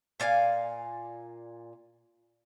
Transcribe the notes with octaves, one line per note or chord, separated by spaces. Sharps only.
A#2 D5 F5 G#5